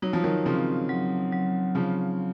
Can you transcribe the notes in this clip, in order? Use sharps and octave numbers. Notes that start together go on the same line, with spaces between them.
F#3 D#4
F3
D#3 F#3
C#3 F3 C4
F#3
F#3
C#3 F3 F#3